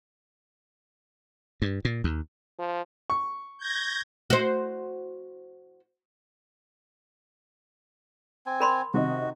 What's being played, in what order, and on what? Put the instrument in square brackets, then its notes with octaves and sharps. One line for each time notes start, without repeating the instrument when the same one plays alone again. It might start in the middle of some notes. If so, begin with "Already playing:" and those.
[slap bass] G2
A#2
D#2
[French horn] F3
[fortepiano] C#6
[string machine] G6 G#6 A#6
[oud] F#4 C5
[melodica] C4 G#5
[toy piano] A#4 B5 C6
[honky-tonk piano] C3 D#3 D#5 [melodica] F#4